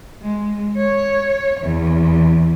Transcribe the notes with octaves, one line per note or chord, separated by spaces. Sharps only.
G#3
C#5
E2